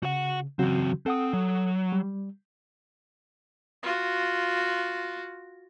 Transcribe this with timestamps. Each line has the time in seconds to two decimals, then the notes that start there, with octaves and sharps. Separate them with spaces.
0.03 C#3 F#4 F#5
0.59 C#3 E3 F#3 C4 F#4
1.06 C4 A4 F#5 D#6
1.33 F#3
1.92 G3
3.83 F4 F#4